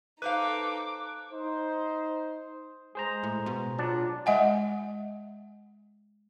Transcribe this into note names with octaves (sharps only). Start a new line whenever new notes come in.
D#4 A4 B4 C5 F5 D6 F#6
D#4 C5
G#3 G#4 C5 A#5
A2
B2
F#3 D4 F4 A5
G#3 D#5 F#5 G#5